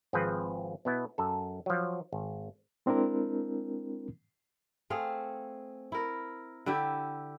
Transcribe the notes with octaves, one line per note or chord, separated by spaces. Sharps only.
G#1 F3 C4 G#4 B4
B2 B3 E4
F#2 A4
F3 F#3
G#1
G#3 C4 D4 E4 A#4
A3 C4 G#4 F5
E4 A#4
D3 E4 G4 E5